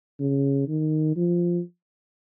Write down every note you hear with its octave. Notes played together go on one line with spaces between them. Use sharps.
C#3
D#3
F3